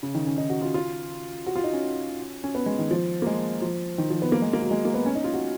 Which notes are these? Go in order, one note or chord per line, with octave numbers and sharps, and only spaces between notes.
C#3
D#3
C#4
D#4
F#4
F4
F4
F#4
F4
D#4
C#4
C#4
B3
G#3
D#3
F3
A#3
G#3
F3
D#3
F3
B3
A#3
G#3
A#3
F#3
G#3
A#3
B3
C#4
D#4
F4
F#4